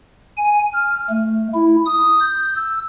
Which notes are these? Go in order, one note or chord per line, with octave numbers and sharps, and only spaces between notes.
G#5
F6
A3
E4
D#6
G6
E6